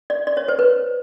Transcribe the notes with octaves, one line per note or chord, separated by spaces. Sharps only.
D5
D5
C#5
C5
B4